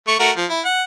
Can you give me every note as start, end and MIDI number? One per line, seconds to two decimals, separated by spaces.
0.08 0.15 57
0.08 0.15 85
0.19 0.31 57
0.19 0.31 66
0.19 0.31 70
0.37 0.46 53
0.50 0.61 64
0.65 0.83 78